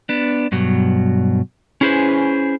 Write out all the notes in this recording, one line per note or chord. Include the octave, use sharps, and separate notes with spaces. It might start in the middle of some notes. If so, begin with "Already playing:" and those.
B3 D4
G2 B2 F#3
C#4 E4 G#4 B4 C5